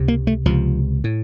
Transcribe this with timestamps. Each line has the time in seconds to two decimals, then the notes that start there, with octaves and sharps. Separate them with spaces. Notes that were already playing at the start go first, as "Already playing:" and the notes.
Already playing: C#2 C3
0.08 A#3
0.27 A3
0.46 C#2 C3 F3
1.04 A2